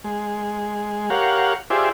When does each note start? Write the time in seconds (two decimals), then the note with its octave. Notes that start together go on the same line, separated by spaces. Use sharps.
0.04 G#3
1.10 G4 A#4 C#5 F5 F#5
1.70 F4 G4 G#4 C5 D5 E5